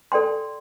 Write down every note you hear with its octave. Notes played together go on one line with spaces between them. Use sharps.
A4 D5 G5 C6